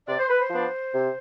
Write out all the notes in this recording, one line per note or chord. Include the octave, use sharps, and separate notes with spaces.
C3 D5
C5
B4
C5
F3 B3 D4
C3